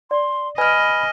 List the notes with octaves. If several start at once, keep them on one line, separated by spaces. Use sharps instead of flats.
D5 C6
B4 D#5 G#5 B5 F6